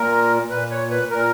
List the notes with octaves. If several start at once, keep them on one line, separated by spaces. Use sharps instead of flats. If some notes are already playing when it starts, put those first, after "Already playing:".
Already playing: A#2 A#4
A#2 B4
C#5
B4
A#2 A#4